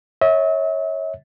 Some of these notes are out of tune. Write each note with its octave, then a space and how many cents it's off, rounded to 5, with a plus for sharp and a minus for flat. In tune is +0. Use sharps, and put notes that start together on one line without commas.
C#5 -10 E5 -40